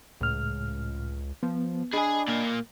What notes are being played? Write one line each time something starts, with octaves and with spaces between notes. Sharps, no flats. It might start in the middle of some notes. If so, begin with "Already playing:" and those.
C#2 A2 F6
F3 B3
D4 G#4 D#5 G#5 B5
A#2 A#3